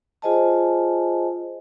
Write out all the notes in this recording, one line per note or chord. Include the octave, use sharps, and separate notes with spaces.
F4 G#4 C5 D#5 G#5 A5